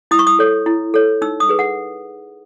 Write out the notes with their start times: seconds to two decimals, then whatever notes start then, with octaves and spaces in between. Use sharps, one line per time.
0.11 E4 D#6
0.19 C#6
0.27 D#6
0.39 A4 C#5
0.66 E4
0.94 A4 C#5
1.22 D#4 E6
1.40 D#6
1.49 G#4 B4
1.59 F#5